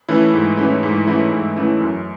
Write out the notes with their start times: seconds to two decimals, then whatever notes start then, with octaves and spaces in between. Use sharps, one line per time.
0.09 E3 A3 C#4 E4
0.34 G#2
0.57 E3 A3 C#4 E4
0.83 G#2
1.07 E3 A3 C#4 E4
1.31 G#2
1.56 E3 A3 C#4 E4
1.81 F#2